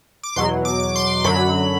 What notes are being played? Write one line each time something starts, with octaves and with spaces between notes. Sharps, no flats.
D6
E2 B2 F#3 C6
D6
D6
C6
F#2 D3 F#3 B5